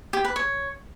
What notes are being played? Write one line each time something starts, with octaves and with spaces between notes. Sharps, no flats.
G4
B4
C#5